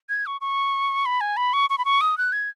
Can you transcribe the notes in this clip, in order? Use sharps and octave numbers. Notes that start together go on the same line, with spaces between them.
G#6
C#6
C#6
B5
G#5
B5
C#6
C#6
B5
C#6
D#6
F#6
G#6